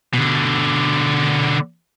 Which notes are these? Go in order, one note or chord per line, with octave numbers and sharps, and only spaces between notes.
B2 D3